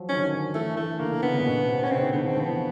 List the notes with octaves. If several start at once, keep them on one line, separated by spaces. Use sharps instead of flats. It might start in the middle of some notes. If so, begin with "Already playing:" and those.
Already playing: F3 F#3
D#3 C#4
D3
D#3
E3 A3
E3 A3
D3 A#3
D3
C#3 B3
D3
A#2
B2
C3
C#4
C#3 C4
D#3
D3 B3
D#3 C4
F3 B3
E3